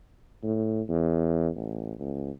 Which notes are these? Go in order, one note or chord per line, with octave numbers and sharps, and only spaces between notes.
A2
E2
A1
C#2